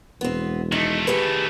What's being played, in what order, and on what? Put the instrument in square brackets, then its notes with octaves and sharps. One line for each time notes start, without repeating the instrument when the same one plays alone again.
[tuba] E1 [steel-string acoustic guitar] B3 C4
[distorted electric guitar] D#3 A3 [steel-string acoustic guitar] D#4
[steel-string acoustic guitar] G4 G#4 B4